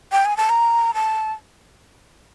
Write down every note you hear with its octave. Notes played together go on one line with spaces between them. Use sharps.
G5
G#5
A5
A#5
A5